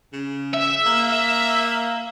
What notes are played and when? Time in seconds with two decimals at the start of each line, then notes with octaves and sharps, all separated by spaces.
0.13 C#3
0.54 E5
0.86 A#3